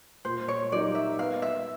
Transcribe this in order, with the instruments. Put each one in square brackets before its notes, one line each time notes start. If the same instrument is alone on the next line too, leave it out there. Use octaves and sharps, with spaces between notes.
[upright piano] A#2 [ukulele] C5
[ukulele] C#5
[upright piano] F#3 A#3 D#4 G4 [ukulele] D5
[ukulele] E5
[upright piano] B3 [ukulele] F5
[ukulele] E5